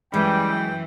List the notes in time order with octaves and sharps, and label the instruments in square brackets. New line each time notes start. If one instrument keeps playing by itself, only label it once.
[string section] F#2 E3 [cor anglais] G3 [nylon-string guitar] G#3 [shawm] G5